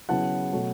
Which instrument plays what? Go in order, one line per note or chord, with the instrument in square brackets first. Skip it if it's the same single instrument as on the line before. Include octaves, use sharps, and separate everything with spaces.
[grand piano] C#3 F#3 B3 E4 [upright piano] F#5 A5
[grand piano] B2 F#3 A3